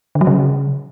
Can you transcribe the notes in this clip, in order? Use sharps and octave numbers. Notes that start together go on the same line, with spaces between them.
D3
F#3
C#3